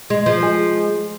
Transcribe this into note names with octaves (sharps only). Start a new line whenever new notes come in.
G#3
F3
G#3